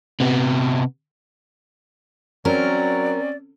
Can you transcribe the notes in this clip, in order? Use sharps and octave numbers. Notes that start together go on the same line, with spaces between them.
C3 B3
F#3 C4 C#4 A#4 D5